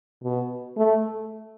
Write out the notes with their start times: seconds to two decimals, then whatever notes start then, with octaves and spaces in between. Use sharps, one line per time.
0.24 B2
0.77 A3